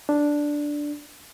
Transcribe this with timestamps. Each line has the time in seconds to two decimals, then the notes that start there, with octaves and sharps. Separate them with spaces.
0.09 D4